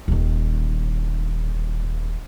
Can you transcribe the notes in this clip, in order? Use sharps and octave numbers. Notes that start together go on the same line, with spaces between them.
D#1 D#3